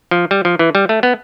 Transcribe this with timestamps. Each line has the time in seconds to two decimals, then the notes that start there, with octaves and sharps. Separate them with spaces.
0.11 F3
0.31 G3
0.45 F3
0.59 E3
0.75 G3
0.89 A3
1.03 B3